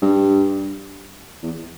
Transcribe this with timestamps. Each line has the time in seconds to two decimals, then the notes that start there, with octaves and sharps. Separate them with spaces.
0.02 G2
1.43 E2